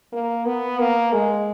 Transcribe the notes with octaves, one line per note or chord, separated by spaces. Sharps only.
A#3
B3
A#3
G#3